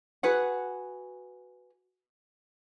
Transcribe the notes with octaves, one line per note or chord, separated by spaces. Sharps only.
F#4 G#4 B4 F#5